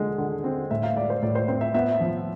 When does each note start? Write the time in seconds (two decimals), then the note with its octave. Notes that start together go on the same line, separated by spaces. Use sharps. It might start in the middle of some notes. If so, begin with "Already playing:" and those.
Already playing: D3 G#3
0.18 D3
0.44 C4
0.71 A2 E5
0.83 F5
0.96 G#3 D5
1.10 C5
1.22 A2 D5
1.35 C5
1.48 C4 C5
1.61 E5
1.74 B3 E5
2.00 F3